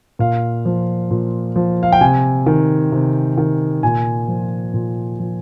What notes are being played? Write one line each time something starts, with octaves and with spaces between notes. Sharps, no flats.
A#2 F5
F3
A#2
F3
F5
G5
C3 G#5
D#3
C3
D#3
A#2 G#5
F3
A#2
F3